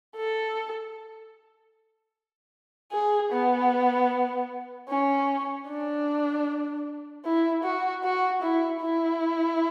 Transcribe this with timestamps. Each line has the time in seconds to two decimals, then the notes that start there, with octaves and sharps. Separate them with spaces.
0.16 A4
2.92 G#4
3.31 B3
4.89 C#4
5.67 D4
7.25 E4
7.63 F#4
8.03 F#4
8.42 E4
8.81 E4